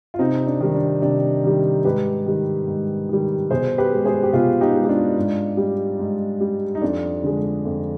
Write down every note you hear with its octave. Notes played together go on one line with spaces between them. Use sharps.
F4
C3 C4 D#4
D4
D#3 G3
D4
C3 D4
D#3 G3
G#2 G4 B4
D#3 G3
G#2
D#3 G3
B2 G#4 C5
G4 B4
G#3
G#4 C5
G4
B2 F4 G#4
D#4 G4
G#3
G4
D4 F4
G#2
G3
G#2
G3
D#4
F2 D4
D3 G#3
F2